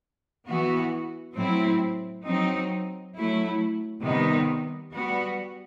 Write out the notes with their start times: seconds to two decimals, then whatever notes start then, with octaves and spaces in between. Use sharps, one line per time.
0.46 E3 B3 F#4
1.36 A2 F#3 C4 E4
2.25 F#3 C4 D#4
3.15 F#3 A3 E4
4.04 C3 D#3 G3 B3 D#4
4.93 G3 B3 F#4